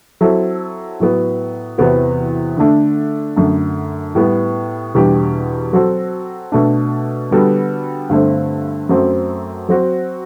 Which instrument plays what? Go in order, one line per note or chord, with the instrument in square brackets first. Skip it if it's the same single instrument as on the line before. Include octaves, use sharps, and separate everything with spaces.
[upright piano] F#3 C4 E4 A4
A2 F#3 B3
E2 C3 E3 B3 F#4
D3 A3 D4
F#2 D3 A3
A2 G3 B3
E2 B2 G3 D4 G4
F#3 C4 F#4 A4
B2 A3 D4
D3 G3 B3 F#4 A4
G2 D3 A3 C4
F#2 F#3 A3 C4
F#3 C4 F#4